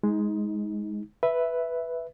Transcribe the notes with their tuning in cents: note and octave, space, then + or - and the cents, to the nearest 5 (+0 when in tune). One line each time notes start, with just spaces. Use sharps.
G#3 +0 D#4 +30
B4 +0 E5 +0